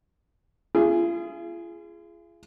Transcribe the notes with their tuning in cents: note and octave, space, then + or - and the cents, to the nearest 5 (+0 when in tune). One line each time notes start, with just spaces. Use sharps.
F4 -45 G#4 +0